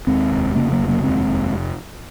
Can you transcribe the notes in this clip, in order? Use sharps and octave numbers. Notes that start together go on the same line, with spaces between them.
D#2 G#3 C4
F1
C#3 A#3 C#4
F#3 A#3
F1
F#3 A#3
D#2 G#3 C4
F1